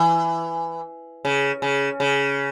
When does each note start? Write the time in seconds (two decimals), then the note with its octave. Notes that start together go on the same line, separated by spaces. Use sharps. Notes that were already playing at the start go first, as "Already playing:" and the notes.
Already playing: E3
1.25 C#3
1.62 C#3
2.00 C#3